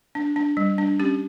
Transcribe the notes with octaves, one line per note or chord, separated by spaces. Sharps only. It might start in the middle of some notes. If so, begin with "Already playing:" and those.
D4
D4
G3
D4
C#4 G4